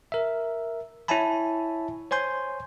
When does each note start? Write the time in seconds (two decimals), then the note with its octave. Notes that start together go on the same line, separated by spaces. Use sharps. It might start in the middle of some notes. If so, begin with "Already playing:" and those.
0.12 A#4 E5
1.08 E4 C#5 E5 G#5 A5 B5
2.11 C5 C#5 G#5 C6 G6